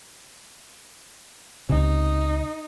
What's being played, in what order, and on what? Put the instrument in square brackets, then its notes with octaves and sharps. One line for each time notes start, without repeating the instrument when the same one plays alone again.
[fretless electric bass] C#2 C3 [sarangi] D#4